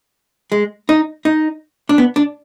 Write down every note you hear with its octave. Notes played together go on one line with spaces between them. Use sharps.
G#3
D#4
D#4
D4
B3
D4